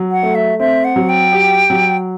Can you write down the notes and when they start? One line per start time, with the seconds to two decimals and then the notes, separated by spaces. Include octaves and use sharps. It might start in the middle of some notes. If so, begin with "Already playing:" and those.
Already playing: F#3
0.12 F#5
0.23 A3
0.35 E5
0.59 C4 E5
0.85 F#5
0.96 F#3
1.09 G5
1.32 G4
1.70 F#3